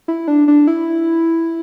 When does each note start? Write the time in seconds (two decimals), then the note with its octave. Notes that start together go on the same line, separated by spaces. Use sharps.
0.08 E4
0.28 D4
0.48 D4
0.67 E4